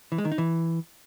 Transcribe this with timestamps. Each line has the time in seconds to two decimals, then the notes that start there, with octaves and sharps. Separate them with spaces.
0.12 E3
0.18 G#3
0.25 D#3
0.32 D#4
0.38 E3